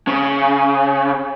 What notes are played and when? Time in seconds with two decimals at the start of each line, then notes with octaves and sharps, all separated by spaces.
0.08 C#3